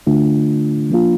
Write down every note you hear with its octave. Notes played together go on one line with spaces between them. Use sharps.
D3 A3 D4 F4
F3 A#3 D4 F4